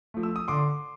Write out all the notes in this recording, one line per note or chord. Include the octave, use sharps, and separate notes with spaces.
F3 A3
E6
D#6
D3 C6 D6